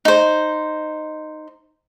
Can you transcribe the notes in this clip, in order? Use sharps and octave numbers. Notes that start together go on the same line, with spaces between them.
D#4 C5